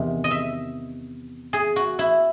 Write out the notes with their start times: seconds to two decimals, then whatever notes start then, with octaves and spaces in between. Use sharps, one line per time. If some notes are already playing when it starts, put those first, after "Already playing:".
Already playing: E2 C3 D#3
0.24 D#5
0.31 E5
1.53 G#4
1.76 F#4
1.99 E4